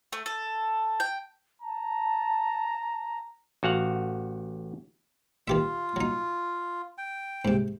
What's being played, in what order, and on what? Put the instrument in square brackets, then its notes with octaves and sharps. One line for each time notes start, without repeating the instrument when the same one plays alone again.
[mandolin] A3
A4
G5
[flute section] A5 [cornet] A#5
[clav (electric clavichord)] A1 F#4 F5 F#5
[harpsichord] D#3 G4 E5 [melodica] F4
[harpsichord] F#3 D#4
[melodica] G5
[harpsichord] G#2 C3